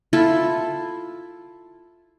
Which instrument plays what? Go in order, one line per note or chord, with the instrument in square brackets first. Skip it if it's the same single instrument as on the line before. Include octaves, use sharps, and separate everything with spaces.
[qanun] E4 F4 A4